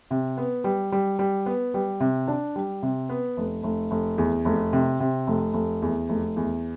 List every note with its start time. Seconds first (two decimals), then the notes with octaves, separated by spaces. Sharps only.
0.11 C3
0.37 B3
0.64 G3
0.92 G3
1.19 G3
1.46 B3
1.74 G3
2.00 C3
2.28 D4
2.56 G3
2.83 C3
3.09 B3
3.37 F1
3.64 F1
3.91 F1
4.18 E2
4.45 F1
4.73 C3
5.00 C3
5.27 F1
5.54 F1
5.82 E2
6.09 F1
6.36 E2